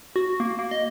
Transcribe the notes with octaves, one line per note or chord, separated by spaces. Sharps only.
F#4
A#3
A#3
D#5